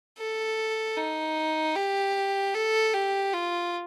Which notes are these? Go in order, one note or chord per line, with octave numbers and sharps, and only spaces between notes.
A4
D#4
G4
A4
G4
F4